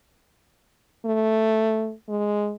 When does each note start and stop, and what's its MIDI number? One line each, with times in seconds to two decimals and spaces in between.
1.05 1.92 57
2.09 2.54 56